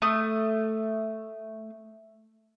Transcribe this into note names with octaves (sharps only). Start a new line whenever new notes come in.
A3 D#6